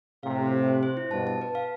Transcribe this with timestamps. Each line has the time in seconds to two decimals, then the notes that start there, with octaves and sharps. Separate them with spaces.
0.23 A2 C3 F5
0.38 C5
0.53 G4
0.68 C5
0.83 C5
0.97 E4
1.11 G2 B2 A5
1.27 A5
1.41 B4
1.55 F5